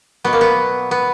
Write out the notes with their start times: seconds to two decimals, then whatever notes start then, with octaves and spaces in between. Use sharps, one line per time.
0.24 B2 F#3 B3
0.33 A#3
0.41 B3
0.91 B3